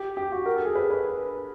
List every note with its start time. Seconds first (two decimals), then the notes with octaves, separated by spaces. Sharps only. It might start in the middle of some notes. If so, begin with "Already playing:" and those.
Already playing: G4
0.17 G4
0.32 F#4
0.46 A#4
0.56 A4
0.65 G#4
0.75 B4
0.90 B4